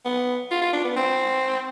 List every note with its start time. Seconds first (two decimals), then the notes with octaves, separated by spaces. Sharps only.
0.05 B3
0.51 F4
0.62 F4
0.73 D4
0.84 B3
0.96 C4